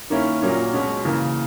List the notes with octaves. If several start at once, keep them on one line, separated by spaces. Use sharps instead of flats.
D#3 A#3 C#4 E4
A#2 F#3 A#3 C#4
B2 G#3 C#4
C#3 E3 A#3